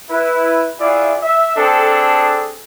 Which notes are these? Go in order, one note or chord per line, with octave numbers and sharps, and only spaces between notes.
E4 B4
E4 F4 G#4 D5 E5 F#5
E5
C4 D4 G#4 A4